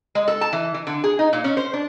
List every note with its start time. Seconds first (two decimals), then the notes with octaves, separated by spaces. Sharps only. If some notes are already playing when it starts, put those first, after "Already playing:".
0.15 G#3
0.28 A4
0.41 A5
0.53 E3
0.74 E3
0.87 D3
1.04 G#4
1.19 D#4
1.33 A#2
1.44 C#4
1.57 C5
1.73 D4